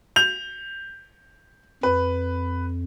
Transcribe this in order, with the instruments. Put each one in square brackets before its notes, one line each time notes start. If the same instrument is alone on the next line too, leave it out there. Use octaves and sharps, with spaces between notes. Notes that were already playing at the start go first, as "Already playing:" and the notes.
[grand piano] G6 F7
[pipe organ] F2 [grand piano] B4